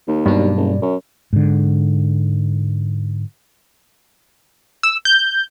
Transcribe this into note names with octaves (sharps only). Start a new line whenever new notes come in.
D#2
G2 B2 F#3 D4
F#1
F#2
G#2 D3
E6
G6